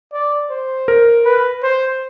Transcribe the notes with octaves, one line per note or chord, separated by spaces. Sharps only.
D5
C5
A#4
B4
C5